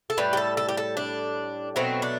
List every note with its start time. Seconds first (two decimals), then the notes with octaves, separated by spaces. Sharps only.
0.10 A4
0.18 A2 G3 B4
0.33 G4
0.37 A4
0.57 A4
0.69 G4
0.77 A4
0.97 D4
1.76 B2 F#3 A3 C4
2.02 D4